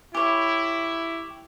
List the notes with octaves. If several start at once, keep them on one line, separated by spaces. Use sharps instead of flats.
E4 G4 C#5